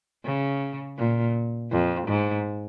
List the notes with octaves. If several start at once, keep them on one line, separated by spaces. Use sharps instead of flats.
C#3
A#2
F2
G#2